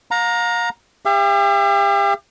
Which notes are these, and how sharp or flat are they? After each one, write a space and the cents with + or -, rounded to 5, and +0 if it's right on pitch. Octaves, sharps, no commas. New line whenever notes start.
F5 +40 A#5 +0
G4 +35 E5 +45